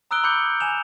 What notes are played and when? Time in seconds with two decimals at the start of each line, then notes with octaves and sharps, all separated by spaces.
0.11 A#5 D#6 E6 F#6 D7 G7
0.24 B5 D6 F#6 G6 C#7 G7
0.60 G#5 E7 F7